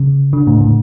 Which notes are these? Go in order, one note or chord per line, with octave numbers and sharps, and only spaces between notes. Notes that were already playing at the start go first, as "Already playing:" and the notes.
Already playing: C#3
D3
A2
A2